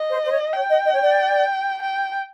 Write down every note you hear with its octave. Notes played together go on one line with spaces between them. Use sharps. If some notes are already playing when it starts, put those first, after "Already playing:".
Already playing: D#5
C5
C5
C#5
C#5 G5
D#5
D#5
C#5
D5
G5